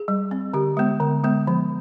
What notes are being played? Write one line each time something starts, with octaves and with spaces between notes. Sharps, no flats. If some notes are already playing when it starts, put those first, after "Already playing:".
Already playing: G#4
G3
C4
D3 G4
G#3 B3
D3
G#3 B3
F3